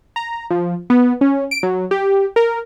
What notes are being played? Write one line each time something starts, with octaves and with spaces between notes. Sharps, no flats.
A#5
F3
B3
C#4
D7
F#3
G4
A#4